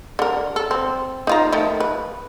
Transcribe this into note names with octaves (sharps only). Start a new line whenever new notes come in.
D3 A#4
A4
C4
D#4 F4 A#5
D#3 F3 A3
B4